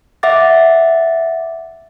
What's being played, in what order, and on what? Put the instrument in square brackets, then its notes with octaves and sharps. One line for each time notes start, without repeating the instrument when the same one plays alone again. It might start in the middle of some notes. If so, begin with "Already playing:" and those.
[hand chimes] E5 F#5 D6 A6